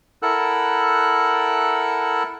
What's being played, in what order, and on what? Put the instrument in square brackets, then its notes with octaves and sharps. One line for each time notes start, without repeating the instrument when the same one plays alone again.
[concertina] E4 A4 A#4 F#5 E6 F#6